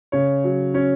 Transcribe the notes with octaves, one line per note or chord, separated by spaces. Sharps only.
C#3 C#5
F#3
C#4 C#5